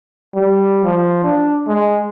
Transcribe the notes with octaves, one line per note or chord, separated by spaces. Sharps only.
G3
F3
D4
G#3